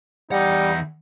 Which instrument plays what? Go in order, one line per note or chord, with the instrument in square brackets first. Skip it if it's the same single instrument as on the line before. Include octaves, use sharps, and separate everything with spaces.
[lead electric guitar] E2 F#5 [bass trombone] G3 [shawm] D#4